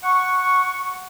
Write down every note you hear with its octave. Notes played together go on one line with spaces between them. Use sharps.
F#5 C#6